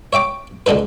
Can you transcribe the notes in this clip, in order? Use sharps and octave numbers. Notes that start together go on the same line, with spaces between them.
C#5 E5 G5 D6
C#2 D3 D4 D#4 B4